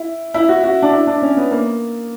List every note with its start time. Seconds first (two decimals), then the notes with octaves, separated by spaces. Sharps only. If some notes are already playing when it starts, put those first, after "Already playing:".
Already playing: E4
0.34 E4
0.49 F#4
0.63 F#4
0.82 D4
0.93 E4
1.07 D4
1.22 C#4
1.37 B3
1.51 A#3